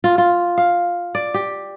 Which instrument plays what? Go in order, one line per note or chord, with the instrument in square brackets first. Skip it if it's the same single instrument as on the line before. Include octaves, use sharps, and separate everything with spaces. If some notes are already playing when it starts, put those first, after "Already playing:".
[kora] F4
F4
F5
D5
G4